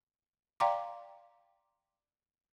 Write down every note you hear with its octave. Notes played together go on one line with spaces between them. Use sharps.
D5 F5 G5 A#5 C6 D6